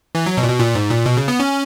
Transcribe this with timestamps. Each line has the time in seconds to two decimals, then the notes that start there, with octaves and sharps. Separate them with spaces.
0.15 E3
0.26 F#3
0.37 B2
0.43 A#2
0.49 B2
0.59 A#2
0.75 G#2
0.90 A#2
1.06 B2
1.17 C#3
1.28 B3
1.40 C#4